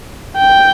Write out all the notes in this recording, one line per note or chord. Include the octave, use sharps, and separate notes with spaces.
G5